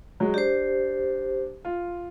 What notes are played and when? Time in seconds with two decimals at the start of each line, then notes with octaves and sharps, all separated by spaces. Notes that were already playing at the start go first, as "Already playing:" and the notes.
0.20 F#3 G#3
0.34 D4 G4 C5
1.65 F4